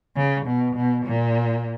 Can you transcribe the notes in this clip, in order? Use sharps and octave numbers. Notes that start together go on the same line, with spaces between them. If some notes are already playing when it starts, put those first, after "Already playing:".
C#3
B2
B2
A#2